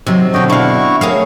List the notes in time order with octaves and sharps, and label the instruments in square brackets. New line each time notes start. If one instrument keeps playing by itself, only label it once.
[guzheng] C3 [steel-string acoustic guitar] D#3 F#3 C4
[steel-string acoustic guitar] B2 D3 [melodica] F#4 D#5 G5
[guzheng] D4 F5 [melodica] E4 F#4 C#6
[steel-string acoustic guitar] A3 F#4 C#5 [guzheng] G#4 A#4 F5